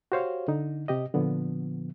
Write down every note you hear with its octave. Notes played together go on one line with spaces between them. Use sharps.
F#4 G4 C5 C#5 F5
D3 D#4
C3 G4 D#5
A#2 D3 F3 B3